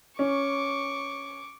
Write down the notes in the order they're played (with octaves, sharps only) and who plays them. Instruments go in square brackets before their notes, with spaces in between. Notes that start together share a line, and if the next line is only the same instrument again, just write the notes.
[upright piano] C#4 [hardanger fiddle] C#6 D6